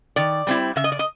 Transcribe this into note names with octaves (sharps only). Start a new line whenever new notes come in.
D#3 D5
G3 C4 E4
C#3 E5
D#5
D5
D#5